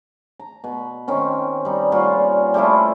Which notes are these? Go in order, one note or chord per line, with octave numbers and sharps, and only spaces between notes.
A#5
B2 B4
D#3 C4 C#4
G3 D#4
A#2 G3 F4 F#4
G3 A3 E4 F4